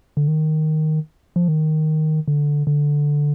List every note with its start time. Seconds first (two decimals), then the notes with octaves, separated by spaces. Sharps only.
0.17 D3
0.28 D#3
1.36 F3
1.48 D#3
2.28 D3
2.67 D3